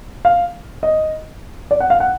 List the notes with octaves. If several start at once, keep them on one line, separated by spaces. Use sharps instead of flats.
F5
D#5
D5
F#5
F5
F#5